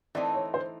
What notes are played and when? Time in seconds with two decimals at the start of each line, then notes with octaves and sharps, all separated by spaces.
0.15 E3 A3 C4 D#4 D5
0.35 C#5
0.54 C5